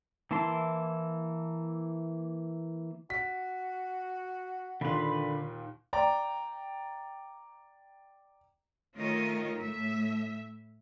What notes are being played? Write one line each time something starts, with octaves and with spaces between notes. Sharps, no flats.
E3 A#3 E4 A5 C6
F#4 B6
D#2 A#2 D3 B4 B5 C6
D5 G5 A#5
D#3 A3 F4 A#4 C#5 D#5
A2 E5